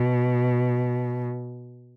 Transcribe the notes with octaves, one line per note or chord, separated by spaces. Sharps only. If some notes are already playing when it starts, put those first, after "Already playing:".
Already playing: B2